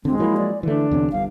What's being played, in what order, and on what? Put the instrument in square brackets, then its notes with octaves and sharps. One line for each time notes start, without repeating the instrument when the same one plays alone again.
[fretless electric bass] D2 D3 [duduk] G#3 [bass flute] C4
[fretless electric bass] F3 F#3 A#3 [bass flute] E4
[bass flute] D5
[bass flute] D3 [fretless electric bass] E3 A3 [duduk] D4
[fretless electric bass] E2 C3 C#4
[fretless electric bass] G1 G2 [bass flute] F5